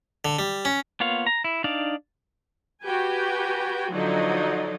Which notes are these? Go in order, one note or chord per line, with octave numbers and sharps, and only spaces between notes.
D3
G3
C#4
A#3 B3 F4 C#5 F5
A#5
E4
D4 D#4 D5 F5
F#4 G4 B4 G5 G#5
D3 F3 F#3 D#4 D5 D#5